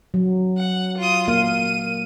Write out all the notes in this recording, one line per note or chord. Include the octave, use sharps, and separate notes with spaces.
F#3
F#5
F4 D#6
A#3 F5 D#7